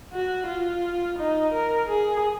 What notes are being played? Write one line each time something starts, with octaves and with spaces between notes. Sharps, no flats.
F#4
F4
D#4
A#4
G#4